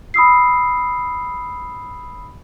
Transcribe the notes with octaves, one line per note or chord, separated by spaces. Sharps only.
B5 D#6 E6 C7